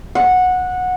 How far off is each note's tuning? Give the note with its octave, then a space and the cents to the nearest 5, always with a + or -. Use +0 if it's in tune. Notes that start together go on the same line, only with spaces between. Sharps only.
F#5 -15